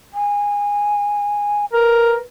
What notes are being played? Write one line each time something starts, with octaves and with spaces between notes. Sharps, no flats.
G#5
A#4 B4